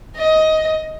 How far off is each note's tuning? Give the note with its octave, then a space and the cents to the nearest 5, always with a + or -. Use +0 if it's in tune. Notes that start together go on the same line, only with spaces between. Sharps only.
D#5 +15